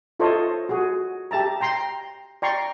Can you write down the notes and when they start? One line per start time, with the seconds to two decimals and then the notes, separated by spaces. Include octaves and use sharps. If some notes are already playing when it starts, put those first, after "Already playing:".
0.20 E4 F4 A4 C5 C#5 D#5
0.69 F#4 G#4
1.31 G4 E5 A5 A#5
1.61 G5 A#5 C6
2.42 D5 G5 A#5 C6 C#6